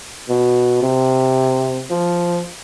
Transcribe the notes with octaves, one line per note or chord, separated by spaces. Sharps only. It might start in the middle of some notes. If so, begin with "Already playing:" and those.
B2
C3
F3